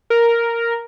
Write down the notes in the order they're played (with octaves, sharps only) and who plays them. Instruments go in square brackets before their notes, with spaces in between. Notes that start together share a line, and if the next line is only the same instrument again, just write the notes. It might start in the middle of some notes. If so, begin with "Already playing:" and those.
[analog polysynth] A#4